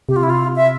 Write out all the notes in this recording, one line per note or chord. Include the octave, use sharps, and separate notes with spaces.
C3 G4
F4
E4
F4
E5